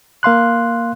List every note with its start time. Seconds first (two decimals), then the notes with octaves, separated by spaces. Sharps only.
0.23 A#3 F5 C6 F#6